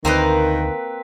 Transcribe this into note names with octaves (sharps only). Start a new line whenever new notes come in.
D2 D#3 A#3 C4 B4 C5 D#5